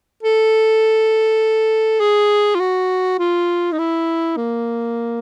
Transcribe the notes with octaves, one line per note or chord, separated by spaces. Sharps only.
A4
G#4
F4
F#4
F4
D#4
E4
A#3